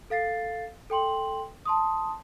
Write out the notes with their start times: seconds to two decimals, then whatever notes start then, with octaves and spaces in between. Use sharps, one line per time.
0.10 A4 F5 A6 C7
0.90 A4 G5 C6 F#7
1.65 A5 C6 D#6